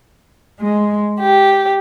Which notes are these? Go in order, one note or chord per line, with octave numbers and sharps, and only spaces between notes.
G#3
G4